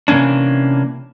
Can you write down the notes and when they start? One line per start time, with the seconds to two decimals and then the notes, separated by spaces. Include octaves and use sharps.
0.08 C3 E3 A#3 C#4 D4